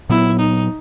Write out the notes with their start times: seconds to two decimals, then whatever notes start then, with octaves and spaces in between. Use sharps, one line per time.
0.09 A#2 F#3 B3 E4
0.39 D#4